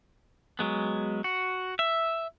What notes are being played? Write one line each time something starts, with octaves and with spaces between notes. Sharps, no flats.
F#3 G#3 B3
F#4
E5